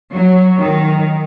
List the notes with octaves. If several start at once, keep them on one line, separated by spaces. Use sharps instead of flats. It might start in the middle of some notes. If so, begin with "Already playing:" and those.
F#3
D#3